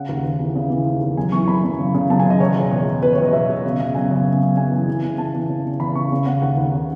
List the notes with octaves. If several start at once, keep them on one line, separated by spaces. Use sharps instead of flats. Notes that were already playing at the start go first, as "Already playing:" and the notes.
Already playing: C#3 F#5
D#2
D#2
E3
C#3
E3
D#2
D#2
F#2 G#5
E3 C#6
F#2 B5
F#2
C#3
C#3
F#2 A5
G#5
C#3
D#5
E2 C#5
B2
E2
E2
E2 B4
C#5
E2 D#5
B2 E5
B2
C#3
C#3
F#2 G#5
C#3
F#2
F#2
F#2 G#5
E3
E3
C#3
E3 A5
E3
C#3
E2
E2 B5
C#3 C#6
C#3
C#3 F#5
D#2 F#5
D#2
C#3